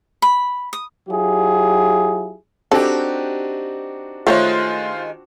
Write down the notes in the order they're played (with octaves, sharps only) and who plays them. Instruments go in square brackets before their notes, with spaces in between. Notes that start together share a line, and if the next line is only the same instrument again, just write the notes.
[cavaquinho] B5
D#6
[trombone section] F#3 E4 F4 G4 G#4
[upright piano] C4 D4 F#4 [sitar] D#4 G4 [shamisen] A4
[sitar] D#3 G#3 [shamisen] A3 A4 C#5 [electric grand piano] F4 C5